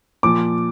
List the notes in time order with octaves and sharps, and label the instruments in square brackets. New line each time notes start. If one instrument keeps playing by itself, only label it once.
[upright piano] A#2 F3 D6